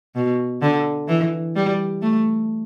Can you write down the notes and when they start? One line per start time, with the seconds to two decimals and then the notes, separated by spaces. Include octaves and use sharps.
0.15 B2
0.62 D3
1.08 E3
1.56 G3
2.02 A3